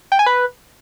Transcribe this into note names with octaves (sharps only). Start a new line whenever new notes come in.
G5
G#5
B4